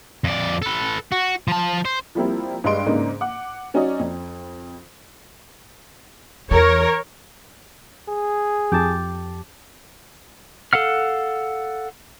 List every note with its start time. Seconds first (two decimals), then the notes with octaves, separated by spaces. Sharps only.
0.24 F2 D5
0.62 A4 B4
1.12 F#4
1.48 F3 A5
1.85 C5
2.15 F3 G3 A#3 C4 E4
2.64 G2 G#3 D4 D#5 C6 D7
2.86 G#2 C#3 A#3 D4 D#4
3.21 F#5 D6
3.74 F#3 C#4 D#4 F#4 D5 D#5
3.99 F2
6.51 E2 E3 A#4 C#5
8.09 G#4
8.72 F2 G4 A5
10.73 A4 F5 F#5 F6